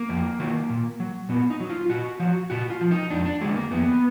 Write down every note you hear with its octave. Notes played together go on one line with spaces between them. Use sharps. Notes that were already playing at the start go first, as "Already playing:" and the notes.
Already playing: A#3
F2
D#3 F#3
A#2
F#3
A#2 B3
D#4
F#3
F4
A#2 F#4
F3 F#4
A#2 F#4
F4
F3
D#4
F2 D4
D4
D3 F#3 G#3
A#3
F2 B3